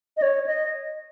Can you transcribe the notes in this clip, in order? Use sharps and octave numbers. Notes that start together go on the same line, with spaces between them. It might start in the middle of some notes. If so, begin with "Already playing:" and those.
D#5
C#5
D#5